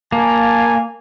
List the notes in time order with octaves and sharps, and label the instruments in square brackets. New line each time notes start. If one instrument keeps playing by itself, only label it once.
[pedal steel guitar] A#3 [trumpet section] G#5 A5